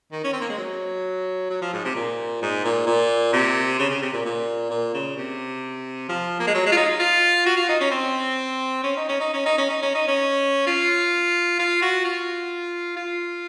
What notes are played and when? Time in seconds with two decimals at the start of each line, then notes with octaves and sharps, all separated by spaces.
0.12 D#3
0.24 C#4
0.33 C4
0.41 A#3
0.49 G#3
0.58 F#3
1.50 F#3
1.61 F3
1.73 G#2
1.84 C3
1.95 A#2
2.42 G#2
2.65 A#2
2.87 A#2
3.33 C3
3.79 C#3
3.90 C#3
4.02 C3
4.13 A#2
4.25 A#2
4.70 A#2
4.94 C#3
5.17 C3
6.09 F3
6.40 A#3
6.47 G#3
6.54 F#3
6.66 G#3
6.72 F4
6.77 D#4
7.00 F4
7.46 F#4
7.57 F4
7.69 D#4
7.80 C#4
7.91 C4
8.83 C#4
8.96 D#4
9.08 C#4
9.20 D#4
9.33 C#4
9.46 D#4
9.58 C#4
9.69 D#4
9.82 C#4
9.95 D#4
10.07 C#4
10.67 F4
11.59 F4
11.82 F#4
12.05 F4
12.96 F4